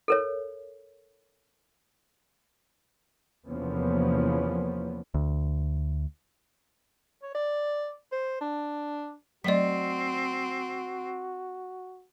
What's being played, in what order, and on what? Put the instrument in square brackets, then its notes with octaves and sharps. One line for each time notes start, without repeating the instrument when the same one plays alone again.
[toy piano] A4 A#4 C#5
[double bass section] E2 C3 F3 A#3 B3 C#4
[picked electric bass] D2
[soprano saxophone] C#5
D5
C5
D4
[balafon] F#3 A3 D#5 [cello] C4 [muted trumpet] F#4 [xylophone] D5 B6